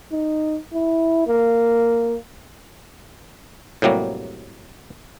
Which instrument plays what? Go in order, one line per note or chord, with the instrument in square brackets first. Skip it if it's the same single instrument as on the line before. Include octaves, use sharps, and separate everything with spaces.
[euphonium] D#4
E4
A#3
[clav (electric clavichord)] A2 C3 F#3 G3 A#3